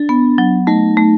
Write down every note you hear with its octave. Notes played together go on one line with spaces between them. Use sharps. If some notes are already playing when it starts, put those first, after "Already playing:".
Already playing: D4
B3
F#3
A3 D#4
A3